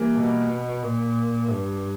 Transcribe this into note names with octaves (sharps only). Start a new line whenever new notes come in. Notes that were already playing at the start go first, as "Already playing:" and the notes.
Already playing: E3 G3 A#3
B2
A#2
G2